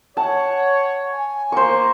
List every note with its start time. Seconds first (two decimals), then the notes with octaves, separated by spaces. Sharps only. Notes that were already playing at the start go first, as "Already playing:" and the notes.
0.17 C#5 F#5 A5
1.12 G#5
1.52 A#3 C5 C#6